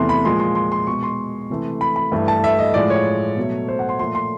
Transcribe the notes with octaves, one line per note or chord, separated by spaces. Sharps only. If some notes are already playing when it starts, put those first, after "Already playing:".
Already playing: E2 C3 E3 A3 C6
B5
A#2 F3 G#3 C6
C6
C6
C6
B2 G#3 C#6
C6
C3 E3 A3
B5
B5
G2 E3 A3
A5
E5
D#5
A2 F3 G#3 D5
C#5
B2 F#3 A3
C5
F#5
C6
A#2 F3 A3 C6
C6